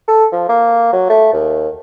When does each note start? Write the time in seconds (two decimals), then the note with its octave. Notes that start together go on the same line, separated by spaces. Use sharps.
0.08 A4
0.32 F3
0.49 A#3
0.93 F#3
1.10 A3
1.33 D#2